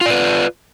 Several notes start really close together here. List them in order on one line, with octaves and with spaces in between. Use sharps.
F4 D5 B4